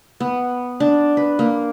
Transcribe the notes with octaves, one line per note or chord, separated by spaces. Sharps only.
B3
D4
B4
A#3